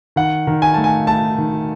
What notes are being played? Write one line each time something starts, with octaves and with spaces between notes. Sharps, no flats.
D#3 F#5
D#3
G#5
A3 A5
G#5
A3 A5
D#3